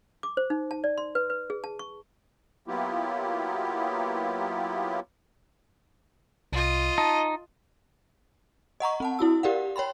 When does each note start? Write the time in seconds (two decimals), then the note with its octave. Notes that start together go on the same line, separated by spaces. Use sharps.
0.23 D6
0.37 C5
0.50 D#4
0.71 A5
0.84 D5
0.98 C6
1.15 B4
1.30 B4
1.50 G#4
1.64 A5
1.79 C#6
2.67 F#3 A#3 B3 E4 F4 G4
6.53 C2 F4 D#5
6.98 D#4 A5
8.80 D#5 F#5 A#5 C#6
9.00 C4 F#5 A5
9.19 E4 F#4 E6
9.43 G4 A#4 D5 F5 F#5
9.76 C#5 G5 B5 C6